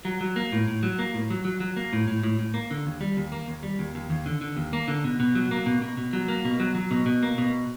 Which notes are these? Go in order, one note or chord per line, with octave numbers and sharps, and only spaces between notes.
F#3
F#3
A#3
A2
A2
F#3
A#3
A2
F#3
F#3
F#3
A#3
A2
A2
A2
A2
A#3
D3
D#2
G3
D#2
A#3
D#2
G3
D#2
D#2
D#2
D3
D3
D#2
A#3
D3
B2
B2
F#3
A#3
B2
B2
B2
F#3
A#3
B2
F#3
F#3
B2
B2
A#3
B2